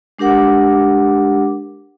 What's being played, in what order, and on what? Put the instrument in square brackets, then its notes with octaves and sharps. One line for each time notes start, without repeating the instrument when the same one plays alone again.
[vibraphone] G#3 D4 G4 A#4 F#5 D6